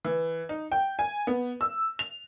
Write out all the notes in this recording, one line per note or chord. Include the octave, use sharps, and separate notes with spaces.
E3
D#4
G5
G#5
B3
E6
F7